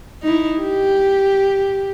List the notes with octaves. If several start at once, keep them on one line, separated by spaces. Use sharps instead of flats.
D#4 E4
G4